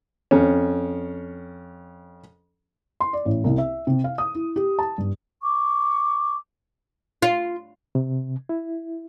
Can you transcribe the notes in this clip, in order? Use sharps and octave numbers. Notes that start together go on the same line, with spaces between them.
F2 C#4
C6
D5
A1
C2
E5
C3
F5
D#6
E4
G4
A5
G2
C#6 D6
F4
C3
E4